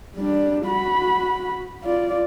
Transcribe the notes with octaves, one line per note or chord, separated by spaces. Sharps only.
G3 D4
F#4 B5
F4 D5